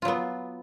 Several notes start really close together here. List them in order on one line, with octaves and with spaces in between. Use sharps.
F4 F#3 B3